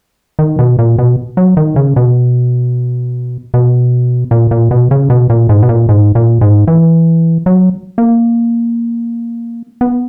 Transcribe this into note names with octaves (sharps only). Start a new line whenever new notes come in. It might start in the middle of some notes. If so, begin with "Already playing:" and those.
D#3
B2
A#2
B2
F#3
D#3
C#3
B2
B2
A#2
A#2
B2
C#3
B2
A#2
G#2
B2
A#2
G#2
A#2
G#2
E3
F#3
A#3
B3